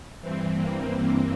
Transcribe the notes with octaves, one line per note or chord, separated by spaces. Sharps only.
G2 E3 C4
A#3